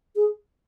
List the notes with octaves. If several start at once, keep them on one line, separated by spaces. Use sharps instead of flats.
G#4